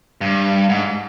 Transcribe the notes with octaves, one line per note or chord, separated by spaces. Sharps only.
G2
G#2